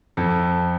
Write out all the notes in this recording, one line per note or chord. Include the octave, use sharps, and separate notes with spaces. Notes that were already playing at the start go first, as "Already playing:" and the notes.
F2 A4